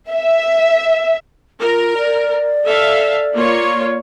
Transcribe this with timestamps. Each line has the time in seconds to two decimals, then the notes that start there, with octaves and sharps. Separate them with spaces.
0.11 E5
1.61 F4 A#4
1.98 D5
2.66 A4 E5 F5
3.34 A#3 F4 C#5